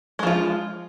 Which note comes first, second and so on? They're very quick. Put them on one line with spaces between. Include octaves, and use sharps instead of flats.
G#3 F3 F4